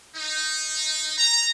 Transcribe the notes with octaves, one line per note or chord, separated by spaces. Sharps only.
D#4
A#5